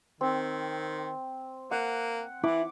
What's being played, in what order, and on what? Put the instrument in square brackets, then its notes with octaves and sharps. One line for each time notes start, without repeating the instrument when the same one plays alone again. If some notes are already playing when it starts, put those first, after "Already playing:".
[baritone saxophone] D#3 [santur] C4
[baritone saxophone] A#3 [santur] F#5
[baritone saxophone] E3 [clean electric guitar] E4 [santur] D6